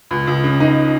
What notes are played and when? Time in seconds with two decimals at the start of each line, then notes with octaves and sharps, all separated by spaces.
0.11 C#2
0.27 C#2
0.44 C#3
0.60 D#4